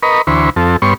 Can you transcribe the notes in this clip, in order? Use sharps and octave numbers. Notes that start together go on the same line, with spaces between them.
A#4 B4 D#5 B5 C#6
D2 E3 C5 B5 C#6
F2 C4 A4
G2 B3 C#5 C6 C#6